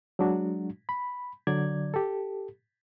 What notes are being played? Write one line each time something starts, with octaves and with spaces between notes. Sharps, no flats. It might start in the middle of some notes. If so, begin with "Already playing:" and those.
F#3 G#3 D4 F#4
B5
D3 F#3 D5 G#6
G4 A4